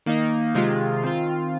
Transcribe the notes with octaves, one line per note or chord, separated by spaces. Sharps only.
D#3 A#3 D#4
C3 D#3 G#3 F4
D#3 C4 F4